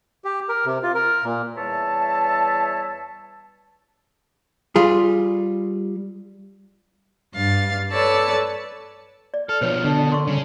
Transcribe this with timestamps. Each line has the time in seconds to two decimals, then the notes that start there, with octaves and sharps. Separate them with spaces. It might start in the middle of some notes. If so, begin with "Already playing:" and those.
0.24 G4
0.49 A#4
0.66 C3
0.83 F4
0.95 A#4
1.24 A#2
1.56 E2 G3 C#5 E5 A5
4.76 G3 F4 G#4
7.35 G2 F5 A6
7.92 A4 B4 C#5 D5 A5 E6
9.34 D5
9.49 A4 F6
9.61 B2 F3 B4 C#5
9.84 B2 D3 D4
10.10 A#4 C6 C#6
10.27 C#3 G3 C#4